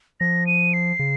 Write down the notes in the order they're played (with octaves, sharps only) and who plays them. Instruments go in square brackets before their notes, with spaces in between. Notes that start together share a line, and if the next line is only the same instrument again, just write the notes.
[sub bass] F3 [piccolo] A#6
[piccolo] D#7
C7
[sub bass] C#3